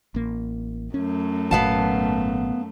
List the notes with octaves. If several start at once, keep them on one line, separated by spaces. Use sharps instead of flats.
A1 A#3
F#2 A3 C#4
G#1 A#2 F#3 B3 F5 A5